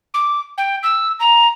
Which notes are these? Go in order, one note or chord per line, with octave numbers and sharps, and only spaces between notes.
D6
G5
E6
A#5